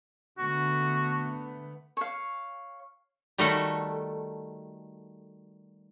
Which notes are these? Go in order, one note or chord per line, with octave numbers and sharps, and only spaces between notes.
D3 A3 B3 F#4
C#5 F5
D#3 G3 A3 F#4 A4